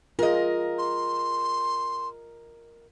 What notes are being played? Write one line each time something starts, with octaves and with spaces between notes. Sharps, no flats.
F4 G#4 A#4 D#5
C6